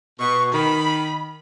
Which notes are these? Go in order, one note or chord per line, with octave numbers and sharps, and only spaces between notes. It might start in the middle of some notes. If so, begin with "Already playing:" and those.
B2 C#6
D#3 B5